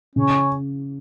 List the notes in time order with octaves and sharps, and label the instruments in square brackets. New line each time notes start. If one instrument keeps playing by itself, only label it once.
[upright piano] C#3 [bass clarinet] C#4